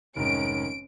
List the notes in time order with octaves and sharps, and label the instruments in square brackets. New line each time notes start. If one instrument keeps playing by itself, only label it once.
[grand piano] F1 G#2 [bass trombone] D#3 [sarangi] C#4 [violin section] D7